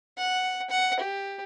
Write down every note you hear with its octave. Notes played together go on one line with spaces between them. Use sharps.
F#5
F#5
G4